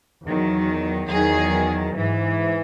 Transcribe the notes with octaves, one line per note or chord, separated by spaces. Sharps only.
E2 D#3 F#3
E2 D#3 F#3 G#4
G#2 E3